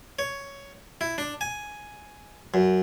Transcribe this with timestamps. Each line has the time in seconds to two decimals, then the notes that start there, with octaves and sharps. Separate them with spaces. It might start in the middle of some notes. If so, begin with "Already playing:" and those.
0.19 C#5
1.01 E4
1.18 D4
1.41 G#5
2.54 F#2